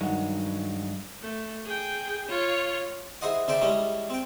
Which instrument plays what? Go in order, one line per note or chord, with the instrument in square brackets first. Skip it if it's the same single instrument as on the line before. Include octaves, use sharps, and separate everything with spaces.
[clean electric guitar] G2 F#3 G#3 [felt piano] D#3 F#5
[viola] A3
G#4 G5
F4 C#5
[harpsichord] E4 G#4 C5 D#5 F#5
C#3 D4 C5 D5 E5 G5
G3 G#3 C#4 D4 E4
C4 G5